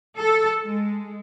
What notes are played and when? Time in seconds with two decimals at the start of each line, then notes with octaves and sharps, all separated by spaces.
0.19 A4
0.65 G#3